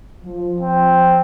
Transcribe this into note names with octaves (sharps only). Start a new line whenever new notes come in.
F3
C4